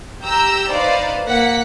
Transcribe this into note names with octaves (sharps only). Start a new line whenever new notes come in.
G4 A#5 E6 G6
D#4 B4 C5 D5 F5
A#3 F#5 B6